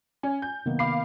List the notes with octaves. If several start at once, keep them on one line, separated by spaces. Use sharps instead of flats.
C#4 G#5
G6
C3 D#3 A#3 B3
F5 B5 D6 C7